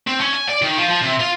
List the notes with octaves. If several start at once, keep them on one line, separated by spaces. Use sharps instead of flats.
C4
C#4
G#5
D5
D#3
F3
F3
C3
F4